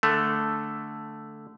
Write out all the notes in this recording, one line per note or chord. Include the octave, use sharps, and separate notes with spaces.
D3 A3